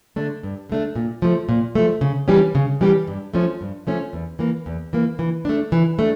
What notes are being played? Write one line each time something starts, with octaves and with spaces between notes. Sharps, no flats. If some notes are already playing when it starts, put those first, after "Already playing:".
D3 A3 D4
G2
D3 A3 D4
A#2
F3 A3
A#2
F3 A3
C#3
E3 G3 C#4 G4
C#3
E3 G3 C#4 G4
G2
F3 A3 C#4
G2
F3 A3 C#4
E2
E3 A#3
E2
E3 A#3
E3
A3 D4
E3
A3 D4